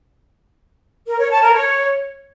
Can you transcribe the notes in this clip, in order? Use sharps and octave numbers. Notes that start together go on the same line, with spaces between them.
A#4
C#5
A5
A#4
C#5